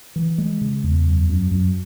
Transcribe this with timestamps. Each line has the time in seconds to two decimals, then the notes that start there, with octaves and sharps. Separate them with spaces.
0.16 E3
0.38 G#3
0.61 C#3
0.84 E2
1.06 F#2
1.29 F#2
1.51 F#2